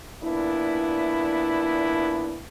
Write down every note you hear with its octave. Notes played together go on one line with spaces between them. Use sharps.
A#2 B3 D4 E4